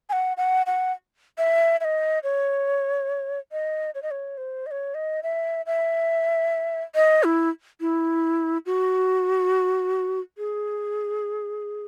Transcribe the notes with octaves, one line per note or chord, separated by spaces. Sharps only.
G#5
F#5
F#5
F#5
E5
E5
D#5
C#5
D#5
C#5
D#5
C#5
C5
D#5
C#5
D#5
E5
E5
D#5
E4
E4
F#4
G#4